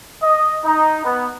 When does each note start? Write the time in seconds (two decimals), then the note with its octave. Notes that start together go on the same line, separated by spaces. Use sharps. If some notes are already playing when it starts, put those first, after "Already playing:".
0.23 D#5
0.63 D#4
1.05 B3